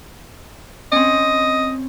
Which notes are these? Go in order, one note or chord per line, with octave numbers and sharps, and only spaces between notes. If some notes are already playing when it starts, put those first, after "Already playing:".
C4 C#4 D#5